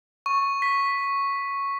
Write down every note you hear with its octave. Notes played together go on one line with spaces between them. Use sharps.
C#6
B6